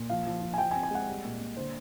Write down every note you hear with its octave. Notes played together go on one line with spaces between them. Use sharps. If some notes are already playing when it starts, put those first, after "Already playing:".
Already playing: A#2
F3 F5
F3
F3
G#5
F3 G5
G#5
C4
G#5
G#3 F#5
G3
A#2
A#2
D3 C5